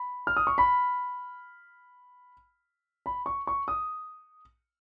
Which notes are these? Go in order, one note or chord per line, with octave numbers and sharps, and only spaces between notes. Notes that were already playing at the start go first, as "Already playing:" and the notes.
Already playing: B5
F6
D#6
C#6
B5
B5
C#6
C#6
D#6